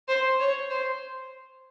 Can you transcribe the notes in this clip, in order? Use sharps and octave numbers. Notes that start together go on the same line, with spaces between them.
C5
C#5
C5